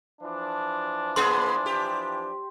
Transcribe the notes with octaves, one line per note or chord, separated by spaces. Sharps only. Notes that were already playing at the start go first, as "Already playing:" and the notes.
E3 F3 D4
A#3 B3 G#4 C6
G4